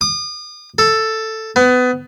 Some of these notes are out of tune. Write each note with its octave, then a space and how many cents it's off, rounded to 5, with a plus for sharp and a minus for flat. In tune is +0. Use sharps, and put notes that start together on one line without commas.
D#6 -40
A4 +5
B3 +25